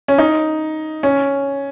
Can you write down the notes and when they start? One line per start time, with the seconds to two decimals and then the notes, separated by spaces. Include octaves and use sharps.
0.08 C#4
0.18 D#4
1.03 C#4